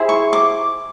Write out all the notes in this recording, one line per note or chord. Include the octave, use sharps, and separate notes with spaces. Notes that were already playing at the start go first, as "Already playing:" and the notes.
Already playing: E4 G#4 C5
C#6
D6